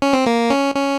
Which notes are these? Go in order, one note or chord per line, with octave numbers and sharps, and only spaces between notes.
C#4
C4
A#3
C#4
C#4